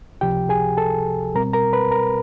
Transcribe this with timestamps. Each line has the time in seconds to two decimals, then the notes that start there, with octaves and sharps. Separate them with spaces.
0.21 C#2 C3 F3 G4 G5
0.49 G#4 G#5
0.77 A4 A5
1.35 B2 G3 C4 A#4 A#5
1.53 A#4 A#5
1.73 B4 B5
1.91 A#4 A#5